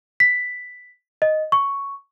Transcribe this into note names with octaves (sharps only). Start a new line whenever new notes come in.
B6
D#5
C#6